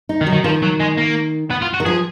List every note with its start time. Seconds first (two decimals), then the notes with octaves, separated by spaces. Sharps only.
0.09 D#4
0.21 D#3
0.27 F#3
0.33 D#3
0.44 D#3 F3
0.62 F#3
0.80 G#3
0.97 A#3
1.50 B3
1.62 F4
1.74 F#4
1.80 D#3
1.85 F3 G#4